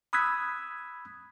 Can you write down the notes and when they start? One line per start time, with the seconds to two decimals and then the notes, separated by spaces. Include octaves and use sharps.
0.13 B5 D#6 E6 F#6 G#6 B6